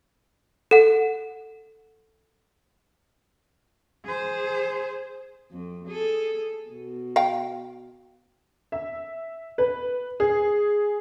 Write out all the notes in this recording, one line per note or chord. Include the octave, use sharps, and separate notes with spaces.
A4 F#5
G#4 C5
F2
G#4 A4
B2
F5 G5
E5
B4
G#4